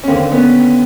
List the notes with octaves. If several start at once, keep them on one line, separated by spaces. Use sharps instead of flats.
C#4
D#2 D3 A#3 C4
B3 C#4